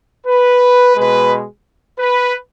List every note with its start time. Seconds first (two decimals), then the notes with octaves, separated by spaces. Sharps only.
0.27 B4
0.96 B2 G#3 B4
1.99 B4